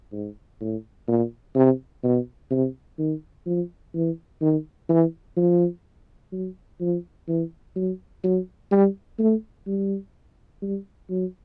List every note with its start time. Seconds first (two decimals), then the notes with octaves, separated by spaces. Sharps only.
0.13 G#2
0.61 A2
1.08 A#2
1.55 C3
2.03 B2
2.51 C3
2.99 D#3
3.47 F3
3.95 E3
4.42 D#3
4.89 E3
5.37 F3
6.33 F#3
6.81 F3
7.28 E3
7.76 F#3
8.24 F#3
8.72 G3
9.19 A3
9.67 G3
10.62 G3
11.10 F#3